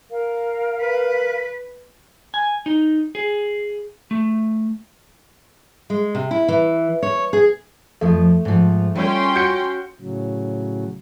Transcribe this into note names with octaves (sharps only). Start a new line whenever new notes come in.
A#4 F5
B4
G#5
D#4
G#4
A3
G#3
C3
E4
E3
C#5
G#4
F2 F3 A3
G#2 F3
G3 C#4 F4 G5 C6
F#4 G6 C#7
A2 C#3 F#3